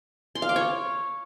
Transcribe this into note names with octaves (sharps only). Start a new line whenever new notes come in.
C6
F5
D6
C#5